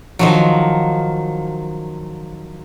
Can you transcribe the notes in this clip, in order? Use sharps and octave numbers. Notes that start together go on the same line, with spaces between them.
D#3 F3 F#3